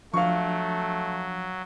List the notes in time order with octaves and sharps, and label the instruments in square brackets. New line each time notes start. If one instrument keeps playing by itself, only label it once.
[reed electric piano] F3 D4 [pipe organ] F#3 [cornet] A3 [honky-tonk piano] F5 C#6